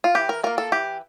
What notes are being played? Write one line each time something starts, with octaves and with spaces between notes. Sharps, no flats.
F4
E3 G4
A#4
A#3 F4 A#4
A4
E3 G4